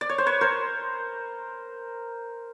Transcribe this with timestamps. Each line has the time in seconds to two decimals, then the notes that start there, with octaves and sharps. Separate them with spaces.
0.01 D5
0.09 C#5
0.18 C5
0.26 B4 C#5
0.41 A#4 C5